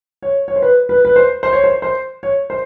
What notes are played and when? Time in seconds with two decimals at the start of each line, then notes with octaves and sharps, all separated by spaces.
0.22 C#5
0.48 C#5
0.56 C5
0.62 B4
0.89 B4
1.05 B4
1.16 C5
1.43 C5
1.53 C#5
1.64 C5
1.82 C5
2.23 C#5
2.50 C5